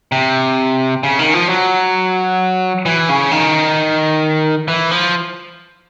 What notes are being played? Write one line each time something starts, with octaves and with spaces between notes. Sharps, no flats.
C3
C#3
D#3
F3
F#3
E3
C#3
D#3
E3
F3